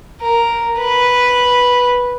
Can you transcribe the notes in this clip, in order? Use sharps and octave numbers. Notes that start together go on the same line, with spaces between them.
A#4
B4